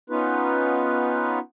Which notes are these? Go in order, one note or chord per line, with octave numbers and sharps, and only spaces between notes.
B3 C#4 D#4 F4 B4